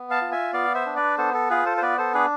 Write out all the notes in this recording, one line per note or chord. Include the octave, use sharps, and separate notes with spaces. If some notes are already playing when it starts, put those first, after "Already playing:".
Already playing: B3
F5 A5
F4
E5 G#5
B3 D5 F5
C5 E5
D4
B4 D5
B3 A4 C5
A4
F4 G#4 B4
A4 C5
C5
B3 B4 D5
A4 C5
D4 G#4 B4